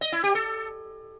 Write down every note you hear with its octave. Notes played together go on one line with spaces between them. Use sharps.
D#5
E4
G4
A4